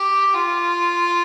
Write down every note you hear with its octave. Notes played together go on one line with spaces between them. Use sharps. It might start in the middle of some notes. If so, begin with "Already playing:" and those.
Already playing: G4
F4